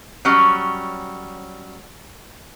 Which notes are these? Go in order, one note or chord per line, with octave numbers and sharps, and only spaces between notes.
F#3 G3 C#4